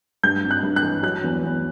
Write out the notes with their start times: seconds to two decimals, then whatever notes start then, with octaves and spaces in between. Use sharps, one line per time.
0.23 G2 G6
0.44 G#1
0.51 F#6
0.63 G2
0.76 F#6
0.83 E3
1.03 F#3 F#6
1.24 E2
1.44 E2